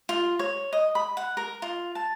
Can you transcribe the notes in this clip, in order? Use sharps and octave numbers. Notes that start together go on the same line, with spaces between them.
F4
C#5
D#5
B5
F#5
A#4
F4
A5